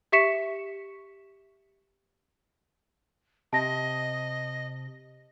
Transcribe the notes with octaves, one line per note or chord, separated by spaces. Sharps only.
G4 E5 C#6 B6 C#7 E7
C3 D#5 A5 A#6